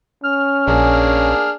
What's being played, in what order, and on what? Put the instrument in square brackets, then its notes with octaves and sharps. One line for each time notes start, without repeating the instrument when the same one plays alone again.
[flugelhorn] C#4 [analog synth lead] F6
[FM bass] A#1 [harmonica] A#3 D4 G#4